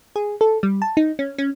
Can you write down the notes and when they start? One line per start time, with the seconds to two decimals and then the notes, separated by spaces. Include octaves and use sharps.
0.16 G#4
0.41 A4
0.63 G3
0.82 A5
0.97 D#4
1.19 C#4
1.38 C#4